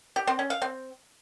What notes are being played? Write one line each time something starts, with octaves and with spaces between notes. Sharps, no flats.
G4
C4
C#4
F5
C4